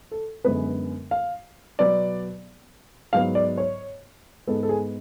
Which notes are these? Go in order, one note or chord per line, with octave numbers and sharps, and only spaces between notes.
A4
F#2 D3 G#3 B3 B4
F5
B2 F#3 B3 D5
G#2 F#3 B3 F5
D5
C#5
G#2 G#3 B3 A4
A4
G#4